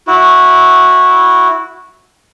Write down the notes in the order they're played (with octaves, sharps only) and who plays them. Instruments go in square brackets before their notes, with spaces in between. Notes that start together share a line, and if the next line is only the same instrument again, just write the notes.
[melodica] E4 F#4